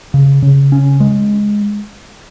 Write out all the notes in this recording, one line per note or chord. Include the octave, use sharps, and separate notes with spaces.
C#3
C#3
C#4
G#3